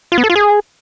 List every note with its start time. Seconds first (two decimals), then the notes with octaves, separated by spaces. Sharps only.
0.12 F4
0.18 B3
0.24 A4
0.30 F4
0.36 G#4